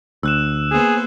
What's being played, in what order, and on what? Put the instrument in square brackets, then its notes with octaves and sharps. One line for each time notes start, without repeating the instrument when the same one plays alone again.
[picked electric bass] D2 [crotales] E6 F#6 E7
[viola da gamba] A#3 B3 C5 [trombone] G#4